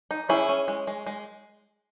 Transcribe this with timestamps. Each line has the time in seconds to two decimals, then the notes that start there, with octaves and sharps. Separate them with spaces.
0.11 D#4
0.29 C#4 E4 G#4
0.49 C#4
0.68 G#3
0.87 G#3
1.06 G#3